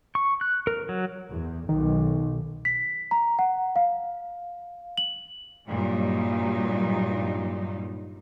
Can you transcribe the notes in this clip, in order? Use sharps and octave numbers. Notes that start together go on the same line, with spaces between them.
C#6
F#6
A#4
F#3
E2
B1 D#3
B6
A#5
F#5
F5
F#7
G2 A#2 F#3 G3 D#4